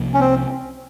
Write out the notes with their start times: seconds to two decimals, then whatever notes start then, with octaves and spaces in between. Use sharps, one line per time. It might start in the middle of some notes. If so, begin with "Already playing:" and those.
Already playing: C2 C3 F3 A#3
0.14 C#4
0.20 C4